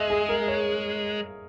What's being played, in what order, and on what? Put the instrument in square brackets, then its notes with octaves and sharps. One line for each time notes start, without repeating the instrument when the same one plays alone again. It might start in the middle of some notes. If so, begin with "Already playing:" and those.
Already playing: [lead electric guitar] G#3 [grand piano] D#5 E5
[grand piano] G#4
A#4
C#5